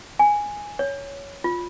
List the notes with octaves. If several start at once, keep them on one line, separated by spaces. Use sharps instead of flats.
G#5
C#5
F4